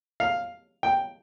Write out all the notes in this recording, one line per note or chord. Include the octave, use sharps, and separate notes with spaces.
F5
G5